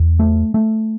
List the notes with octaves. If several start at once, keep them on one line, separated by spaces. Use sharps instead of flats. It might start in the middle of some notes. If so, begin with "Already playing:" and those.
Already playing: E2
A3
A3